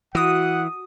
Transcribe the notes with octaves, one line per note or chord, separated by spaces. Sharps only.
E3 F#4 F#5 D#6